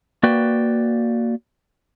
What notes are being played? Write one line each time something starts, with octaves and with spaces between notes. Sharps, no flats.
A#3 F#4 B4 D5 G5